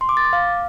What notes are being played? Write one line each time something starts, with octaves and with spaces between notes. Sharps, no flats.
C6
D6
A6
D6
F5